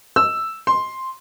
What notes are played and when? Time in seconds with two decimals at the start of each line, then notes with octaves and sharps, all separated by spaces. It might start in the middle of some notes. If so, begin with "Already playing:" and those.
0.16 E6
0.67 C6